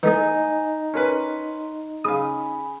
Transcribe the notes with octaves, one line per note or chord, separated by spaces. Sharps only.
E3 A3 D#4 G#4 G#5
C#4 A#4 B4 C6
C#3 F5 G#5 B5 D#6